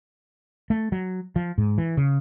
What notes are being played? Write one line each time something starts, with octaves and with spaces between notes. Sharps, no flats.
A3
F#3
F3
G#2
E3
C#3